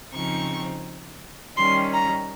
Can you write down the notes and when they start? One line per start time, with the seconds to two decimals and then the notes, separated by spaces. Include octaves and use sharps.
0.12 C#3 F3 C4 D#4 C#6
1.56 D#3 G3 C#4 C6
1.92 A#5